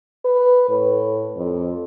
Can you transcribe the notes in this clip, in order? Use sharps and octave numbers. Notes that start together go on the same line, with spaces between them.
B4
A2
F2